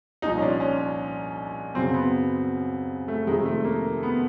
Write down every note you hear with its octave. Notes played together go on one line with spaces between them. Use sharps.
C2 A#2 F3 D#4
C#4
D4
C#4
F#2 C#3 F#3 C4
B3
A3
F2 C3 D#3 G#3
A3
A#3
B3